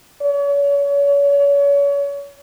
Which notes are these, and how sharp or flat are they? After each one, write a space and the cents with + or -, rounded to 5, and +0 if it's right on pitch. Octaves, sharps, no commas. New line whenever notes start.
C#5 +35